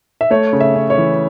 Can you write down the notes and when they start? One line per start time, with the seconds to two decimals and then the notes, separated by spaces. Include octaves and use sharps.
0.21 E5
0.30 A3 C#5
0.53 C#3
0.60 E5
0.75 C#4
0.90 C#5
0.98 E3